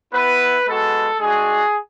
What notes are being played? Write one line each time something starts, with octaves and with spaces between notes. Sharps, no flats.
B3 E4 B4
G#3 B3 F#4 A4
G#3 D4 F#4 G#4